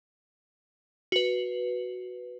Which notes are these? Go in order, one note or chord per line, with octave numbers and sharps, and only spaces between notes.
F#4 B4